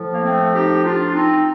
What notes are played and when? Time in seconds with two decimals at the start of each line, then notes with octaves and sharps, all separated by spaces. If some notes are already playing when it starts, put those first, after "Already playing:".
Already playing: A2 F3
0.12 A#3
0.23 A3 C4
0.53 D#4 G4
0.83 D4 F4
1.13 C4 D#4